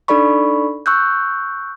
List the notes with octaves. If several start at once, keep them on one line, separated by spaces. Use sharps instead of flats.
D4 D#4 A4 D5 B5 C#6
C#6 E6 F#6 G6